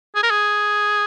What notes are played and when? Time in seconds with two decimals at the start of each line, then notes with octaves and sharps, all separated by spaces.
0.16 G#4
0.23 A#4
0.30 G#4